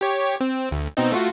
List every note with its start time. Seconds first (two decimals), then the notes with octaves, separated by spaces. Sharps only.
0.01 G4 C#5
0.41 C4
0.71 D2
0.97 B2 C4 D#4
1.12 A3 F4 F#4